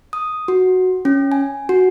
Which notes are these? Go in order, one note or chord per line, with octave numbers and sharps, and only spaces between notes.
D#6
F#4
C#4
G#5
F#4